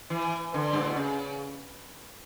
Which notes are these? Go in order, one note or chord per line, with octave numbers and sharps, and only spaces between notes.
E3
D3
G2
A2
B2
C#3